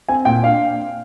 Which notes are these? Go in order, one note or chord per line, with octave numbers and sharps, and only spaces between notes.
C4 G#5
A#2 G5
D4 F5